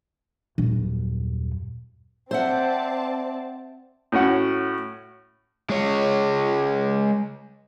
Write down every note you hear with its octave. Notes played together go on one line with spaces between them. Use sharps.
D#1 F#2
C4 C5 D5 E5 F#5 A5
A2 C#4 F#4 F#5
G#3 C#5